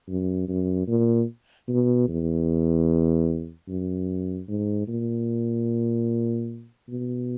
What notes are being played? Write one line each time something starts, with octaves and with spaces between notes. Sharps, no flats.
F#2
F#2
A#2
B2
E2
F#2
G#2
A#2
B2